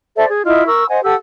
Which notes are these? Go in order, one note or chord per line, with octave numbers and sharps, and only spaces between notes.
A4 C5 D5 E5
G#4
E4 F4 D#5
A#4 C#6 E6
C5 D#5 F#5 G#5
G4 A4 F#5 E6